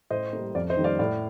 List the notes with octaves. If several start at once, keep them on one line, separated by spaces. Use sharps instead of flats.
A2 C5 D#5
G3 A#3
F2 D5 F5
C5 D#5
D#3 G3 A#3
D5 F5
A2 D5 F5